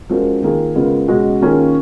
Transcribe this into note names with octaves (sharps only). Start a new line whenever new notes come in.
F3 G#3 C#4 F#4 A#4
D#3 A#3 F4 G#4
C#3 G#3 B3 F4 A#4
B2 G#3 C#4 F#4
D#3 A#3 C#4 F4 G#4